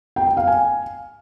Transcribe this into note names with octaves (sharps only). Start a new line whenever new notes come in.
G5
G5
F5
G#5